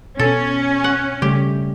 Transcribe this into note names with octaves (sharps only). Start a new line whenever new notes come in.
B2 C#4 A4
F#5
C#3 G3 A3 G4